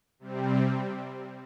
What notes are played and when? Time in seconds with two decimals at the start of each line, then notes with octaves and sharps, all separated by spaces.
0.19 C3 G3 C4